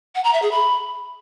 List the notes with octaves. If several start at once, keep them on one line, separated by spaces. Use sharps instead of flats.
F#5
A#5
E5
G#4
B5